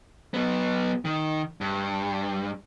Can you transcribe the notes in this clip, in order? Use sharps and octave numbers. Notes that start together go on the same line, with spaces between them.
F#3 B3
D#3
G2